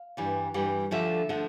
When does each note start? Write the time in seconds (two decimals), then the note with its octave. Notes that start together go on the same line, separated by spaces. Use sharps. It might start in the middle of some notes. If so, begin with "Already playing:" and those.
Already playing: F5
0.17 G2 E3 G3
0.54 G2 E3 G3
0.91 D2 D3 F3 A3 E5
1.29 D3 F3 A3